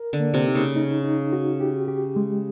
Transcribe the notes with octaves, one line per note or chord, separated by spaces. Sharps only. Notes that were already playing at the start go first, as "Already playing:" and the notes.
Already playing: A#4
D3
A#3
C3
D#4
C#3
D#4
D#4
F#4
G4
G4
G#3